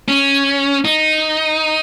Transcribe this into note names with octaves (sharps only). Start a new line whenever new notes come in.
C#4
D#4